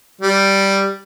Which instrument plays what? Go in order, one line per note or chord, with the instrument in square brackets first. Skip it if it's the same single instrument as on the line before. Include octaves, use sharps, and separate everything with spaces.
[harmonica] G3